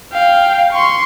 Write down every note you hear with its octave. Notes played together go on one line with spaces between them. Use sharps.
F5 G5
C6 C#6